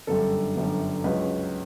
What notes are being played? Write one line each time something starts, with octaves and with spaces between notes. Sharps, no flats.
G1 F#2 D3 G3 A4
G1 F#2 D3 G3
C#2 C#3 F#3 B4